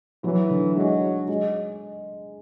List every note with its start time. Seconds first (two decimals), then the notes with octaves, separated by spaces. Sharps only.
0.24 E3 F#3
0.50 D3
0.76 F#3 G#3
1.28 G#3